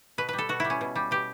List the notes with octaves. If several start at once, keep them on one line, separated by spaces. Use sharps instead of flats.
B2 B4
G3 B4
A4
B2 F#4
G3 E4
C#4
B2
G3
B2 G4